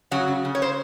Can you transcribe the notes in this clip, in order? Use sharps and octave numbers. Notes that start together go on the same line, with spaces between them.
C#3 F#3 F#4
C#3
C#3
C#5
C5